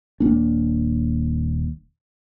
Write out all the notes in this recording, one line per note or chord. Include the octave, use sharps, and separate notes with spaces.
D#1 A#3 D4